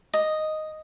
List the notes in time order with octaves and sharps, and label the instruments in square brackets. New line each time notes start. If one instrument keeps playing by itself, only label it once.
[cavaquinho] D#5